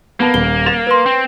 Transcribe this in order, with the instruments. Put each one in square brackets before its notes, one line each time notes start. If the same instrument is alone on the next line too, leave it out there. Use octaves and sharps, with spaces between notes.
[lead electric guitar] A#3 [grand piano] B3 A5
[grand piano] D#1 [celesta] G7
[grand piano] A6 E7 F7
[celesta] B4 C6
[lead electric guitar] C4